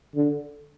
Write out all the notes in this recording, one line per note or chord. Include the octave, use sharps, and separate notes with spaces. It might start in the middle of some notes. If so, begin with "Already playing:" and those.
D3